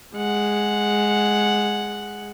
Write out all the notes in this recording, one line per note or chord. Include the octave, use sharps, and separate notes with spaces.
G#3 F#5